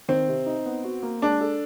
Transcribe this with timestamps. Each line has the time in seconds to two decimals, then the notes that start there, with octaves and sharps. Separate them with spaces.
0.08 D#3 C4
0.28 C3
0.46 D#4
0.65 B3
0.84 F#4
1.03 A#3
1.22 G#3 D4
1.41 A4